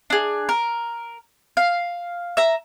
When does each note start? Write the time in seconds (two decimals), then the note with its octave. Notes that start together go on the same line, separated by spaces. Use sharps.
0.10 D4 G#4
0.49 A#4
1.57 F5
2.37 E5 A#5